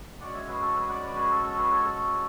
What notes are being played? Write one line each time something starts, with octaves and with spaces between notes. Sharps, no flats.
G#3 C#4 F#4 D5 F#5
C#5 E5
G#4 B4
A4
G#4 B4
D5 F#5
B4 D5
G#4 B4
A4
A4
G#4 B4
A4 C#5
A4